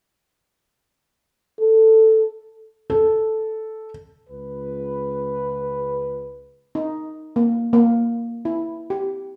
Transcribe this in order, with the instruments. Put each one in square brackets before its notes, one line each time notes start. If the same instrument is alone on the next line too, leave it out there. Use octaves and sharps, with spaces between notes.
[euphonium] A4
[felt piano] A4
[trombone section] C#2 B4
[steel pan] D#4
A#3
A#3
E4
G4